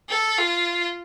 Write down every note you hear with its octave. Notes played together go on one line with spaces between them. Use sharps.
A4
F4